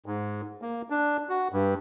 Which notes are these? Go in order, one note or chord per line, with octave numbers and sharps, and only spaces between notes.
G#2
A#3
D4
F#4
G2